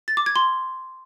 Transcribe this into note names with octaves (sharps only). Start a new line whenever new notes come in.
A6
D6
G#6
C6